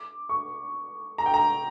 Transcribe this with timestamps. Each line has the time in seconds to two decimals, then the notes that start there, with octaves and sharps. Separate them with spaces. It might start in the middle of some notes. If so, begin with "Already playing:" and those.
Already playing: D6
0.29 C#6
1.18 A#5
1.26 G5
1.34 A#5